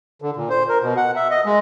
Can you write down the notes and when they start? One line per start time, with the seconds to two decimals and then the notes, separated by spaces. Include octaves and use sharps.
0.22 D3
0.36 A#2
0.49 C5
0.69 A#4
0.82 B2
0.97 F#5
1.16 E5
1.30 D#5
1.45 G#3